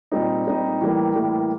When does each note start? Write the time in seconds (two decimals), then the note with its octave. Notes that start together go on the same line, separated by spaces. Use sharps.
0.12 A#2 G3 C4 D#4
0.46 A#2 G3 C4 D#4
0.81 A2 E3 G3 A#3
1.15 A2 E3 G3 A#3